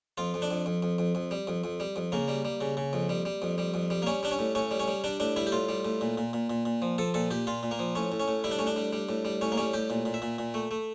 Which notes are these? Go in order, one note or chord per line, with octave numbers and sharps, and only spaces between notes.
F2 F4
F2
D4
F2
F2
F2
F2
F2
G3
F2
F2
G3
F2
C#3 A#3
G3
G3
C#3
C#3
F2
G3
G3
F2
G3
F2
G3
A#3
G3 C#4
G3 D4
C#4
A2
A2 C#4
G3
C#4
G3
G3 D4
A2 D4
G3 E4
G4
A2 F4
G3
A2
A#2
A#2
A#2
A#2
A#2
F3
F3 A4
A#2 A4
A#2 G4
A#2 F4
A#2
A#3
F3
A2 C#4
A2
C#4
A2
G3 E4
D4
A2 C#4
D4
G3
G3
A2
G3
A2 C#4
A#3
G3 C#4
A2 G4
A#2
A#2
E5
A#2
A#2
A3
A3